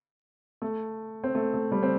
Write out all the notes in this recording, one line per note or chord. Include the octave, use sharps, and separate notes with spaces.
A3
C4
A3
A3
G3
C4